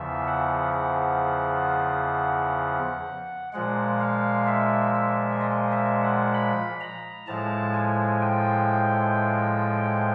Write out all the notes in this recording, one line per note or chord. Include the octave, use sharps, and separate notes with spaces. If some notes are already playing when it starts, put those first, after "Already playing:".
Already playing: E2 C#3 F3 E5
F#5
F#5
A#2 F3 G#3 F#5
F5
E5
E5
D#5
E5
F#5
B5
A#5
A2 F3 G#3 A5
G#5
G5